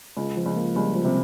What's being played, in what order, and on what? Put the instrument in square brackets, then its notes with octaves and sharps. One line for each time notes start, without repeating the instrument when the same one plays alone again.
[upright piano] C#2
[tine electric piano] F3
[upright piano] C#2
[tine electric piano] A#3
[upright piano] C#2 [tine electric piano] G3
[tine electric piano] F3
[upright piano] C3